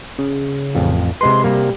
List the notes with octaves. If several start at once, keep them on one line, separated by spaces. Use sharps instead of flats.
C#3
A1 F2
C3 G#3 B4 C6
C3 G3 A#3